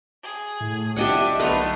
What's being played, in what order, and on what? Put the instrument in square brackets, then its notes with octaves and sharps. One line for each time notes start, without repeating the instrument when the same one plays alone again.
[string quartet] G#4
[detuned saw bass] A2
[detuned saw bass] C2 [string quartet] D4 E5 [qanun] G4 D#5 F#5
[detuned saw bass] B1 [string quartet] D3 A3 B3 [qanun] B4 A#5